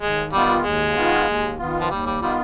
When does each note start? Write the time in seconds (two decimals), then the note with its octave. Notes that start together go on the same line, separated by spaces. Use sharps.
0.02 D#2 G#3
0.33 D#3 G3 B3 F4
0.64 D#2 G#3
0.96 D#3 B3 F4
1.27 D#2
1.59 D#3 B3 F4
1.80 F3
1.90 D#2 G3
2.06 G3
2.22 D#3 G3 B3 F4